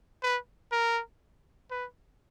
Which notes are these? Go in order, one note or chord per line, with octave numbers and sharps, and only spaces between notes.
B4
A#4
B4